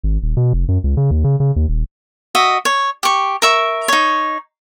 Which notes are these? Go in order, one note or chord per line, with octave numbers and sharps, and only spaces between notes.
G#1
D#1
B2
F1
F#2
C#2
C#3
D#2
C#3
C#3
D#2
D#1
F#4 D#5 E5
C#5
G4 C#6
A#4 E5 C#6
D#4 C#5